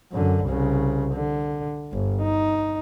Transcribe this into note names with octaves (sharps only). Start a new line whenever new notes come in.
F#2 D3
C2 C#3
D3
G1
D#4